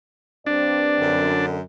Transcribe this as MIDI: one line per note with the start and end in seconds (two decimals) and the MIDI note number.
0.46 1.35 43
0.46 1.35 60
0.46 1.46 62
0.46 1.35 74
0.99 1.60 42
0.99 1.60 50